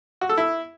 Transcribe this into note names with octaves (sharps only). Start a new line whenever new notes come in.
F#4
A4
E4